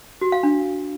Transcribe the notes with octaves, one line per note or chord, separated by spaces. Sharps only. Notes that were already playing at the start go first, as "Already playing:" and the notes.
F#4
F5
D4